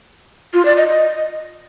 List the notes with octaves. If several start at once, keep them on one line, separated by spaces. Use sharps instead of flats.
F4
D5
D#5
D#5